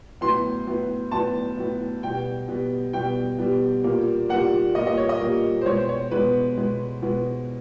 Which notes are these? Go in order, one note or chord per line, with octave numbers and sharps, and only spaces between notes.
A2 F#3 B3 C6
A2 F#3 B3
A2 F#3 B3 A5
A2 F#3 B3
B2 G3 B3 G5
B2 G3 B3
B2 G3 B3 G5
B2 G3 B3
A#2 G3 A#3
A#2 G3 A#3 F#5
A#2 G3 A#3 D#5
D#5
C#5
D#5
A#2 G3 A#3
C5
B2 G#3 B3 C#5
C5
C#5
B2 G#3 B3 B4
B2 G#3 B3
B2 G#3 B3